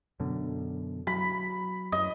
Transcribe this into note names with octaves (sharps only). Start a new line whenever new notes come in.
F#2 B2 D3
F#3 B5
F#2 D#5